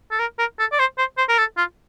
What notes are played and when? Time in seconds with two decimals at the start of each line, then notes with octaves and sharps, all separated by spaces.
0.11 A4
0.19 A#4
0.39 A#4
0.59 A4
0.72 D5
0.79 C5
0.98 C5
1.18 C5
1.29 A#4
1.38 A4
1.57 F4